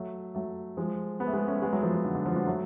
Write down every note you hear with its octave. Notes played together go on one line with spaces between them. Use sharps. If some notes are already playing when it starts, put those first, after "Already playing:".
Already playing: F#3 A3
F#3 A3
F3 G#3
G#3 B3
A3
G#3 B3
A3 C#4
G#3 B3
F#3 A3
F3 G#3
F3
D3
D3
F3
D3 F#3
F#3 A3